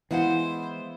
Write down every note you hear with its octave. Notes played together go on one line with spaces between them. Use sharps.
E3 G#3 B3 E4 C5 F5 F#5